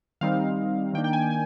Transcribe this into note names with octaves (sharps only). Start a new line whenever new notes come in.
D#3 G3 C4 D#4 F5
D#3 A#3 D4 G5
G5
G#5
G#5